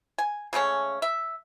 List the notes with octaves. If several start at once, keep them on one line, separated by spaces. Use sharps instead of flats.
G#5
C#3 G#3 A3 C#4
E5